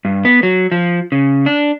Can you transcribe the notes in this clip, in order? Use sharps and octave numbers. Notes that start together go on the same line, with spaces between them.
G2
B3
F#3
F3
C#3
D4